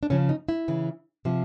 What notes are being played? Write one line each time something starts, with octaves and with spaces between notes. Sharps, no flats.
D4
C#3 F3 C#4
D#4
E4
C#3 E3
C3 F3